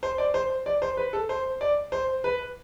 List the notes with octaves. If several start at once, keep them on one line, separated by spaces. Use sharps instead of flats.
C5
D5
C5
D5
C5
B4
A4
C5
D5
C5
B4